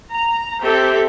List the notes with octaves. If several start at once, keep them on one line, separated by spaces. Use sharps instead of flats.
A#5
C4 G4 A4 E5